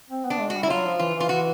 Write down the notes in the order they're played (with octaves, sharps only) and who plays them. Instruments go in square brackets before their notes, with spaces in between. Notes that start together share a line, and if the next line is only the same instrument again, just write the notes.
[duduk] C4
B3
[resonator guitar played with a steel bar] D4
[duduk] G#3
[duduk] G3 [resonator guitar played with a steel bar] F#4
[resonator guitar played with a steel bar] E4
[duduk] F#3 [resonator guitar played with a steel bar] F4
[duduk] F3
[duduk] E3 [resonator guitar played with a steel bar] F4
[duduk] E3
[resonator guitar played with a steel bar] F4
[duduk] E3 [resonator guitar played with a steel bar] F#4